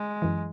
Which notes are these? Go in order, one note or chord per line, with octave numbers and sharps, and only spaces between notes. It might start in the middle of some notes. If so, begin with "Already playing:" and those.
Already playing: G#3
F#2 E3